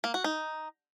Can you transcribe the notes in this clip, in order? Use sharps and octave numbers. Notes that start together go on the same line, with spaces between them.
A#3
F#4
D#4